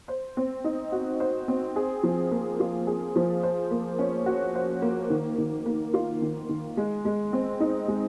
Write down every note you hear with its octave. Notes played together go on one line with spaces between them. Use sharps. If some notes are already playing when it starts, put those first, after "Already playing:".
C5
C4
D#4
F#4
C5
C4
G#4
F3
A#3
F4
G#4
F3
C5
A#3
C#4
F#4
C5
A#3
D#3
D#3
A#3
F4
D#3
D#3
G#3
G#3
C4
D#4
G#3